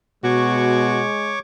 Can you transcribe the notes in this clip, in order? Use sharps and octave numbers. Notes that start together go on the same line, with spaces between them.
B2 G#3 F#4 C#5 C#6 D6